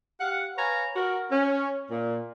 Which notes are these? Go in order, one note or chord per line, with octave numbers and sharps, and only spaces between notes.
G4 F5 F#5
B4 C#5 F5 G#5 A#5
F#4 A#4
C#4
A#2